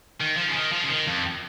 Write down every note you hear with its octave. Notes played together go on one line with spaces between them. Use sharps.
D#3
F3
C#3
D#3
F3
C#3
D#3
F2